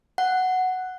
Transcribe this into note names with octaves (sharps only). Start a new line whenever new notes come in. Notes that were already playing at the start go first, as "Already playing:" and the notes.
F#5